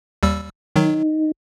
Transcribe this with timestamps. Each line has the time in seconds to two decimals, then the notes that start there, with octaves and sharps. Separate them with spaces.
0.23 D#2 G3 E6
0.76 D#3 F#3 D#4